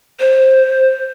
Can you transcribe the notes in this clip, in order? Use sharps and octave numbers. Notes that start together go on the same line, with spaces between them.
C5